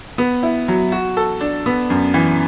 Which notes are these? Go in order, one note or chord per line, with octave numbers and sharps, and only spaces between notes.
B3
E4
F#3
F#4
A4
D4
B3
F#2
E3